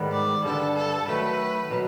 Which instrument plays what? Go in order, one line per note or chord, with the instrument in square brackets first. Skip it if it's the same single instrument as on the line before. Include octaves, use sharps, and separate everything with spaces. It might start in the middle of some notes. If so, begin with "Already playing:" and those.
Already playing: [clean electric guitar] G#2 D#3 G3 B3
[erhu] D5
[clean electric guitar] G2 D3 G3 [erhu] A4
[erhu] A4
[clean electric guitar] D#3 F#3 A3 [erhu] B4
[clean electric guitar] B2 F#3